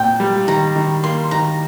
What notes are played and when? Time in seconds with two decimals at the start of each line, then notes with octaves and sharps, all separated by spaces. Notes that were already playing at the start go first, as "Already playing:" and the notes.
Already playing: A#2 C4 G5
0.20 G3
0.48 D#3 A#5
0.76 D#3
1.04 A#3 C6
1.31 D#3 A#5